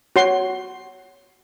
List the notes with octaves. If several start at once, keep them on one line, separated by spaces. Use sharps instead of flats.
F#4 C#5 C6